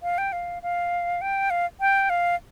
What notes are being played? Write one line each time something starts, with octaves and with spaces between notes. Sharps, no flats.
F5
G5
F5
F5
G5
F5
G5
F5